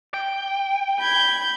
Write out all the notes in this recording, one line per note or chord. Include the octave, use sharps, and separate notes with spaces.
G5
B5 G6 G#6